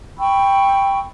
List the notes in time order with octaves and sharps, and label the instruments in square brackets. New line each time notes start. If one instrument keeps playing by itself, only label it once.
[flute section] G5 B5 C#6 E6